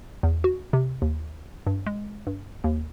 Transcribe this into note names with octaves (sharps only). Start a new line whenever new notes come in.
E2
F#4
C3
D#2
G2
G#3
G2
D#2